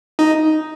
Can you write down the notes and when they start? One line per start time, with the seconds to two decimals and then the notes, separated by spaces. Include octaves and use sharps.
0.19 D#4